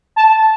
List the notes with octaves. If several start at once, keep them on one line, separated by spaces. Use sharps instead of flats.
A5